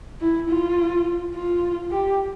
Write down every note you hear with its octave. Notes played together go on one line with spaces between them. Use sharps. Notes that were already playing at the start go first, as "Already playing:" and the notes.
E4
F4
F4
G4